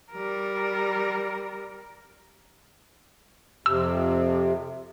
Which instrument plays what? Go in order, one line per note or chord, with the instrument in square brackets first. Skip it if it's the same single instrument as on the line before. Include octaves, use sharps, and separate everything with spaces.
[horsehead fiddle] G3 A#4
[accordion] F2 C3 [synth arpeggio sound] E6